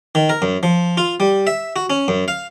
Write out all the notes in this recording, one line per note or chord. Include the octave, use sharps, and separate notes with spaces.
D#3
A#4
F#2
F3
F4
G3
E5
F#4
C#4
F#2
F5